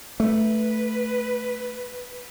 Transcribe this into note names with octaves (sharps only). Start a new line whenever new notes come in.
A3 B4